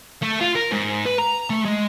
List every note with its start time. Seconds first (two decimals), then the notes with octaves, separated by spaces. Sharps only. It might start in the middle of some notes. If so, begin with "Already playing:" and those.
0.23 A3
0.41 F4
0.56 A#4
0.72 G#2
1.06 B4
1.19 A#5
1.50 A3
1.65 G#3